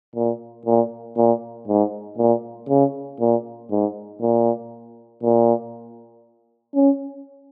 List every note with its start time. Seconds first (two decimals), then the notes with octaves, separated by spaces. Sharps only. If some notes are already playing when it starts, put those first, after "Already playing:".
0.16 A#2
0.65 A#2
1.17 A#2
1.68 G#2
2.18 A#2
2.69 C#3
3.20 A#2
3.71 G#2
4.21 A#2
5.23 A#2
6.75 C#4